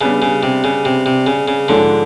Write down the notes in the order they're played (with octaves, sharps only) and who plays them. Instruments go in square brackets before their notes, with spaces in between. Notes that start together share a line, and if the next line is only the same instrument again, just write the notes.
[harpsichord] C#3 [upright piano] G3 B3 D4 G4 B4
[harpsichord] C#3
C3
C#3
C3
C3
C#3
C#3
[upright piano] G#2 F3 G#3 C#4 [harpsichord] D3